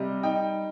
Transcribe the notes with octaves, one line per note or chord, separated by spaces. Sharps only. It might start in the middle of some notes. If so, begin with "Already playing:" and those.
Already playing: C3 G3 D#5
D#4 G5